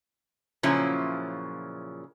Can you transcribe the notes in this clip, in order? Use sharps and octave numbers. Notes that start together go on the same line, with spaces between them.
A#2 C#3 F3 F#3 C#4 E4